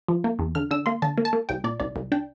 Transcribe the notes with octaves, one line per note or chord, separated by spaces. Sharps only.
F3
A#3
E2
D3 F6
D3 E6
A#3 C6
D3 A5
A#3
A5
A#3
C2 G5
A#2 D5
C2 D5
C2
D4 G5